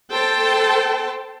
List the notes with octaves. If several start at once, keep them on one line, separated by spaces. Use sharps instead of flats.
A4 C5 G5 A5